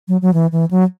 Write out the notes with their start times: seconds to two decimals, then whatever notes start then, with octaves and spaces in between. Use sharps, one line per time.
0.08 F#3
0.22 F#3
0.33 E3
0.52 E3
0.71 F#3